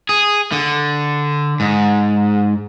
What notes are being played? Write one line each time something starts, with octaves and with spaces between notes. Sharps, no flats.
G#4
D3
G#2